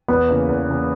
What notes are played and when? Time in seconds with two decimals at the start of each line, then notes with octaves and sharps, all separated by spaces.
0.08 E2 B3
0.28 C#3 E3 A#3
0.49 E2
0.69 C#3 E3 A#3